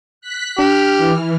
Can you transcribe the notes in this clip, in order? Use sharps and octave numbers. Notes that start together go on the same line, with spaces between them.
F#6 B6
D4 G4 F6
E3